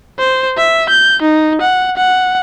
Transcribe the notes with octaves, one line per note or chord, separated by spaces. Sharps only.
C5
E5
G6
D#4
F#5
F#5